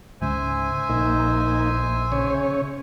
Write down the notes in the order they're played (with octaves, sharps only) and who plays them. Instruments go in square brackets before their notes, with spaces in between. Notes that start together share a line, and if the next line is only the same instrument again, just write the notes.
[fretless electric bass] C#2 G#2 C#3 [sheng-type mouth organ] C5 E5 G#5
[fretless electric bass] A#1 [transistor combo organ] A#3 D#4
[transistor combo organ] C#3 C#5